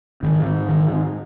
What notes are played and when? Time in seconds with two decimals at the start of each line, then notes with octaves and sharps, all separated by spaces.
0.23 G#2 D#3
0.69 D#3